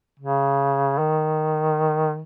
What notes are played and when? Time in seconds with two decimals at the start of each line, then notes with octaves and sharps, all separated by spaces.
0.19 C#3
0.98 D#3